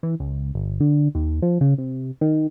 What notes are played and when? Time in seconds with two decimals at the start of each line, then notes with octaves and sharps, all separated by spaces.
0.03 E3
0.20 C#2
0.54 G1
0.80 D3
1.15 D#2
1.42 F3
1.61 C#3
1.78 C3
2.21 D#3